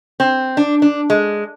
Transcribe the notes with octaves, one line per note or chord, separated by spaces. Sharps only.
C4
D4
D4
G#3